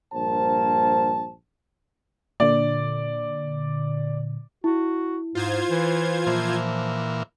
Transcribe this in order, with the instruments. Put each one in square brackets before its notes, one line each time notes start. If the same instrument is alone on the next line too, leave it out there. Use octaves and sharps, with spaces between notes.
[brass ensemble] A#1 G2 A#3 C5 A5
[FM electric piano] A#2 D3 [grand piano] D5
[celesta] E4 [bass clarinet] F#4
[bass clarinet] G#2 [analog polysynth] F4 C5 G#6
[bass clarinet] E3
[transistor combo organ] A#2 E3 [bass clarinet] F3